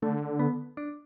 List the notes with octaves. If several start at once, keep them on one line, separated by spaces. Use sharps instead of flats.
D3 A3
B3
D4